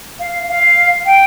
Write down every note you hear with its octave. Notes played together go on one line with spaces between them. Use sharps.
F5
F5
G5